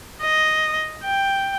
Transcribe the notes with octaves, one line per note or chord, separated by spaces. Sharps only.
D#5
G5